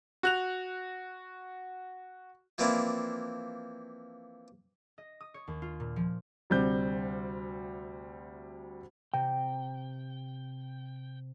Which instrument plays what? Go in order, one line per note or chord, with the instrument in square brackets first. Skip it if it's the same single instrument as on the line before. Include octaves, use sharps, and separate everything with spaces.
[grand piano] F#4 F#6 F7
[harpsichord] E3 F3 A#3 C4 D4 E4
[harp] D#5
D#6
C#5
D#2
F4
A#2
F3
[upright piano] D2 C3 G3 C4 G6
[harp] C3 [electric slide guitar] G5